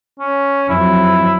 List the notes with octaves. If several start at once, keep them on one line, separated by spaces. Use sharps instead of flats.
C#4
F2 F#3 E4